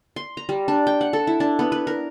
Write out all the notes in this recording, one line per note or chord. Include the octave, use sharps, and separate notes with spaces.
C6
A#5
G3
D4
G5
F#5
A4
E4
D4
B3
B4
A#4